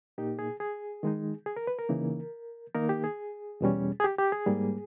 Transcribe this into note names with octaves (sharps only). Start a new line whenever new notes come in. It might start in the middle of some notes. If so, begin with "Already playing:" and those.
A#2 A#3 D#4 G4
G#4
G#4
D#3 G#3 D#4
G#4
A#4
B4
A#4
C#3 E3 A#3 D#4
D#3 A#3 D#4 A#4
G4
G#4
E2 B2 G3 C#4
G#4
G4
G4
G#4
G#2 G3 A#3